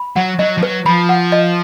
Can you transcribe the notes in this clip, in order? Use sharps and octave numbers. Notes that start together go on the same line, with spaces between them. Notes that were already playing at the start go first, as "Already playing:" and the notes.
Already playing: B5
F#3 F#5
F#3 D#5
F3
F#3 B4
F3 B5
F#5
D#5